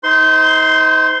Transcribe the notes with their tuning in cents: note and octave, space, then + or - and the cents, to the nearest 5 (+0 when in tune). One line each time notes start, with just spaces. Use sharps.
D#4 +35 C5 -30 C6 +0